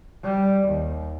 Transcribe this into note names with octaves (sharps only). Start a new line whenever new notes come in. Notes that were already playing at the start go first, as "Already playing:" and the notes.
G3
D#2